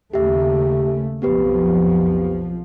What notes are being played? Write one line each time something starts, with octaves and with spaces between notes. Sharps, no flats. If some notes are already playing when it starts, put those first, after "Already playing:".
D#2 C#3 A3 G4 E5
B1 F2 F3 B3 G4 B4